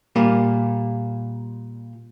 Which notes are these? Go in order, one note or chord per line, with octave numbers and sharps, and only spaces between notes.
A#2 G3 A#3